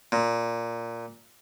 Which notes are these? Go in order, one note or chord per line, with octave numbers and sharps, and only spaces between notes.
A#2